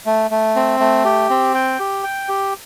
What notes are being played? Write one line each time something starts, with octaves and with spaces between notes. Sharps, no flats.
A3
A3
C4
A3
G4
C4
G5
G4
G5
G4